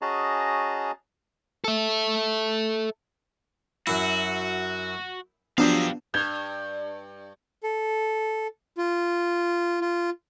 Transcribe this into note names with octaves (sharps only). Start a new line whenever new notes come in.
C#4 F#4 G#4 D#5 A5 A#5
A4 E5
F#2 E4 F#4
F3 F#3 B3 D4 G4 F5
G2 G6 G#6 G7
A4
F4
F4